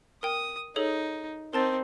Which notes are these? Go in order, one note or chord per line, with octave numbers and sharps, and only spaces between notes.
A#4 G5 D#6
D#4 G#4 A4 C#5
C4 D#4 A#4 A5 A6